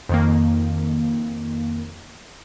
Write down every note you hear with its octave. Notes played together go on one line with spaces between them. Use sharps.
F2 D#3 A#3